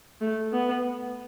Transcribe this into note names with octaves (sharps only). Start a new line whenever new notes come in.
A3
B3